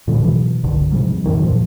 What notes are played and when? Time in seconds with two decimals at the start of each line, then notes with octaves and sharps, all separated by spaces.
0.08 A#2 D3 F3 G#3
0.20 G#2 B2 E3 F#3
0.64 C2 G2 D3 D#3
0.92 G#2 C3 F3 G3
1.24 F#2 C3 D#3 E3
1.42 E2 G2 A#2 F3